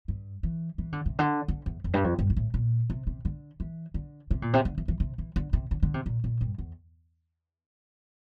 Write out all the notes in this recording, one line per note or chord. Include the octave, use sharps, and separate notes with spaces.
G2
E3
E3
D3
C3
D3
D3
E2
F2
G2
F2
G2
G2
A2
A#2
C3
C3
D3
E3
D3
C3
A#2
C3
D3
E3
E3
C3
E3
D3
C3
D3
D3
C3
A#2
A#2
G2
E2